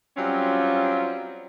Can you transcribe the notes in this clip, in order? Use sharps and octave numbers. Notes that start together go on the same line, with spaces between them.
F#3 G3 C4 C#4 F4